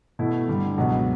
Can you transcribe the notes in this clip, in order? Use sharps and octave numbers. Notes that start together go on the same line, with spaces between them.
B2 A3 E4
G2 D3 G3
C#2 B2 F#3